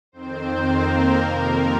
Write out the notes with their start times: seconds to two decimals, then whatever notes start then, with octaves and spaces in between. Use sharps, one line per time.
0.12 F2 D#3 C4 C5
0.65 A#3 A#4
1.19 F2 C3 F3 A#3 A#4